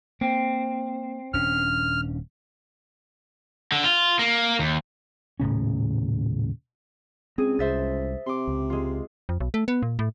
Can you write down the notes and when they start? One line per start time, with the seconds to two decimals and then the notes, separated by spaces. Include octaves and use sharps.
0.21 A#3 C4
1.34 D#1 C#4 D4 F6
3.72 D3
3.84 F4
4.19 A#3
4.59 D#2
5.40 D#1 A2 C#3 C#4
7.38 C#2 C4 G#4 D#7
7.59 C2 C5 E5 A6
8.26 C3 C6 D6
8.47 C#2
8.70 G#3 F4
9.29 F2
9.40 B1
9.54 A3
9.68 B3
9.83 A#2
9.99 A2